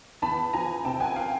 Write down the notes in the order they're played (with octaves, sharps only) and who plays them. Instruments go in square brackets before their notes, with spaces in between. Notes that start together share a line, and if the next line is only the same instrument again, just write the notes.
[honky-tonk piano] E2 A5 B5
F3 G#5 A#5
C3 G5 A5
F#5 G#5
F5 G5